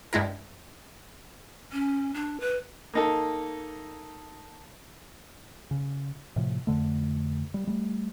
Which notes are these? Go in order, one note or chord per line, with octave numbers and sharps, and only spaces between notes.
G2 G#3 E4 A#4
C#4
D4
B4
A#3 D#4 A4
C#3
A2 C3 F3
F2 D3 A3
G3
G3 A3